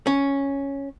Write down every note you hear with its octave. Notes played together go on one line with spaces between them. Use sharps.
C#4